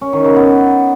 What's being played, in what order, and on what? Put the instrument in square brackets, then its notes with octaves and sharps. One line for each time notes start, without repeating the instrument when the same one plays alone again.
[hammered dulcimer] C#4
D#3
C#3
B3